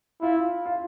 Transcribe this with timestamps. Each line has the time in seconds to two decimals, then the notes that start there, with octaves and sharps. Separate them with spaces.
0.21 E4 F4
0.65 F4